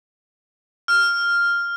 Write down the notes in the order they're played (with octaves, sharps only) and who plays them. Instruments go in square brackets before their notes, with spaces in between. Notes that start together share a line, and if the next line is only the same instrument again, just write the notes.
[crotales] F6